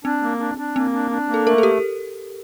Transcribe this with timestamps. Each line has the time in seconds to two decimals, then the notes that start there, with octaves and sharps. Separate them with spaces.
0.05 C4 D4
0.22 A#3
0.40 D4
0.58 D4
0.76 A#3 C4
0.93 D4
1.11 D4
1.28 A#3
1.34 A4
1.46 A3 A#4
1.58 A4
1.63 G4